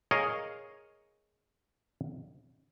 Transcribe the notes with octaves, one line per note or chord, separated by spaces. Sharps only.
G#4 A#4 C#5 D#5 F5